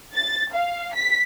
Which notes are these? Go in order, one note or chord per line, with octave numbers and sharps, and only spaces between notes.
A6
F5
B6